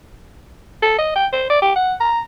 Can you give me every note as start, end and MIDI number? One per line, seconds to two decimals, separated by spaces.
0.82 0.98 69
0.99 1.12 75
1.16 1.27 79
1.33 1.46 72
1.50 1.61 74
1.62 1.73 67
1.76 1.94 78
2.00 2.20 82